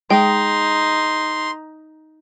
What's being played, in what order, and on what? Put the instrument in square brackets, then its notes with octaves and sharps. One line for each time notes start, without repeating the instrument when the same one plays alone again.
[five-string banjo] G#3 [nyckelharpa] D#4 [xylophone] G5 [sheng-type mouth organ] C6